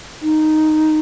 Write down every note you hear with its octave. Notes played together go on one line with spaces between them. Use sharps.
D#4